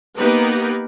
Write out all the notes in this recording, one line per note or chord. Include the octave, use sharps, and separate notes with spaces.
A#3 B3 D#4 G4 A#4 B4